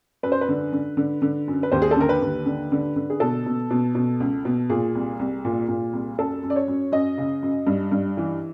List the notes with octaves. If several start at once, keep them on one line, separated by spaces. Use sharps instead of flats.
F#2 B4
C5
B4
D3
D3
D3
D3
F#2
B4
D#2 C5
G#4
A4
D3 A#4
B4
D#2
D3
D3
D3
G#4
B2 A4
B2
B2
B2
C#2
B2
A#2 G#4
C2
C2
A#2
A#2
C2
F#2 A4
F#2
D5
C#5
F#2
F#2 D#5
C#3
F#2
G2
G2
E3